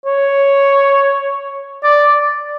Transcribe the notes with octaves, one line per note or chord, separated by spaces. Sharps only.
C#5
D5